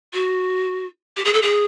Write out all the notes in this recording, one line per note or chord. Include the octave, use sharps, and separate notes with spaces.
F#4
G4
G#4
A4
G#4